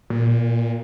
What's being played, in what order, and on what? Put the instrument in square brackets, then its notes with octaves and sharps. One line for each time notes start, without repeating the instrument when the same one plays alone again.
[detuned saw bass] A#2